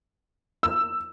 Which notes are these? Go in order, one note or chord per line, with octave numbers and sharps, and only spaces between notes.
E6